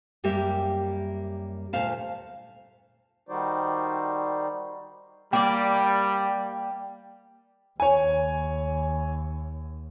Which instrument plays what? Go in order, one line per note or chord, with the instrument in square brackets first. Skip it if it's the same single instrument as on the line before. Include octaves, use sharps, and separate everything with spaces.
[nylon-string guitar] F#2 G3 A#3 G4 A#4 E5
D2 A#2 A3 C5 F5 A5
[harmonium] D#3 G3 D#4 F#4 C5 D5
[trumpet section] G3 [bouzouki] A#3 D5 [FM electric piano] G5
[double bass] D#2 [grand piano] C#5 G#5